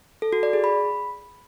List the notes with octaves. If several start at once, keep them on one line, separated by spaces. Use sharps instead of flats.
A4
F#4
D5
G#4
B5